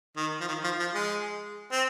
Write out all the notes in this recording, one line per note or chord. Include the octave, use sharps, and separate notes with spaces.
D#3
F3
D#3
F3
F3
G#3
C4